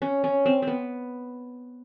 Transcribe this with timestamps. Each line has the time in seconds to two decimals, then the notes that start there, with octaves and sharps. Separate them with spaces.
0.02 C#4
0.24 C#4
0.46 C4
0.62 C4
0.67 B3